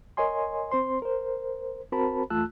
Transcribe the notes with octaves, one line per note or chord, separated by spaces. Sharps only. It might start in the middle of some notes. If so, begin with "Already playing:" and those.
A#4 C#5 D#5 G#5 C6
C4 C5 C6
A#4 C5
C4 F#4 A#4 C5 A5 B5
E2 A3 F4 A5 E6 F#6